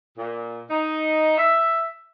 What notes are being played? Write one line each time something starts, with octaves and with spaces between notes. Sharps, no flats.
A#2
D#4
E5